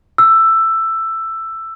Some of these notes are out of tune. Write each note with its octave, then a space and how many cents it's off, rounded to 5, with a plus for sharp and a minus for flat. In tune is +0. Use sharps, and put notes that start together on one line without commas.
E6 +10